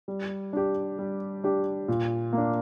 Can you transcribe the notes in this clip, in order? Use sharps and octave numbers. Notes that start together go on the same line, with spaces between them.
G3
D4 G4
G3
D4 G4
A#2
A#3 D4